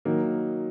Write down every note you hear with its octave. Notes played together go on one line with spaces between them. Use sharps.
D#3 F#3 A#3 D#4